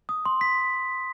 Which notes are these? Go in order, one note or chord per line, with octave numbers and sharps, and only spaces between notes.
D#6
C6
B6